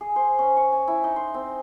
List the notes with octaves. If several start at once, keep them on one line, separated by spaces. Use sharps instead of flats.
G#4
C5
C#4
C#6
G#5
E4
D#4
C6
C4